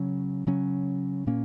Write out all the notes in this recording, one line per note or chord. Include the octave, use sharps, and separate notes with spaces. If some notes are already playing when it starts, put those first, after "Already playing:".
Already playing: C#3 F#3 C#4
C#3 F#3 C#4
A#2 A#3 C#4